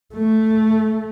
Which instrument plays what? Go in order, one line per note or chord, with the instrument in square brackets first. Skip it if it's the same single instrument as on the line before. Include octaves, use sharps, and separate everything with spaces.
[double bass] A3